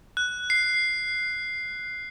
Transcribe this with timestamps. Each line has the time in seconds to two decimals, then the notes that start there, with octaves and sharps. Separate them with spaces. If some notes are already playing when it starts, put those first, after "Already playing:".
0.17 F#6
0.50 C7